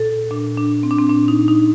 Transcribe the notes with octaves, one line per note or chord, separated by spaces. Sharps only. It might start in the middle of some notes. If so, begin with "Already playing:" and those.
Already playing: A#2 A4
A#2 D4
D4
C4
D4
C4
A#2 D4
D#4
D#4